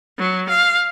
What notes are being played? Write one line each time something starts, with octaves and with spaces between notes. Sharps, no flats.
F#3
F5